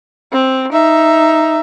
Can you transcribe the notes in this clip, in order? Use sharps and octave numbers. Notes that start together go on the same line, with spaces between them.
C4
D#4 E5